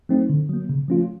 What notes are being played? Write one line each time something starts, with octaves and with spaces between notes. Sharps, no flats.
F#3 A3 C4 D#4
D3
F#3 A#3
C#3
F3 A3 C#4 F4